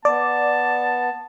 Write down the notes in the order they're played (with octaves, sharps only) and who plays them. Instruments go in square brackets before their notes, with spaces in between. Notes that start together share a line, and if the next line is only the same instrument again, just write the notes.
[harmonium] B3 [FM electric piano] D5 [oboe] A5